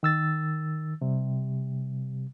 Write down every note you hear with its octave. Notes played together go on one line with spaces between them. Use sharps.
D#3 E6 A6
C3 G3